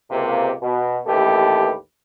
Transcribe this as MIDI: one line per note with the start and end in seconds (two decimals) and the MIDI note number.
0.11 0.52 37
0.11 0.52 48
0.11 0.52 58
0.62 0.99 47
1.07 1.72 33
1.07 1.72 39
1.07 1.72 57
1.07 1.72 67
1.07 1.72 69
1.07 1.72 71